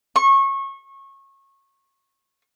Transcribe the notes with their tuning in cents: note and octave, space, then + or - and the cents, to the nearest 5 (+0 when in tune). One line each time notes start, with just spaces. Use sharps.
C#6 -25